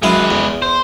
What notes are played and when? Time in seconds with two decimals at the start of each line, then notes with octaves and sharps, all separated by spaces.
0.03 F#2 G#3 E4 B4 F5
0.31 E2
0.62 C5